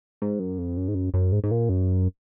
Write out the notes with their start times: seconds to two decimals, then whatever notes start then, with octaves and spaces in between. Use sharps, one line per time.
0.22 G#2
0.39 F#2
0.58 F2
0.77 F#2
0.88 G#2
0.95 F#2
1.14 F#2
1.32 G#2
1.44 G#2
1.51 A#2
1.69 F#2